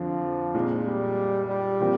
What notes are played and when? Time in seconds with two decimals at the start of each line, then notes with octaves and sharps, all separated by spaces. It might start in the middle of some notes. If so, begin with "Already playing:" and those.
Already playing: F2 D3 F3 D4
0.54 A#2 G#3 C4 D#4
0.86 G3
1.49 G3
1.81 A#2 F3 C4 G4 A#4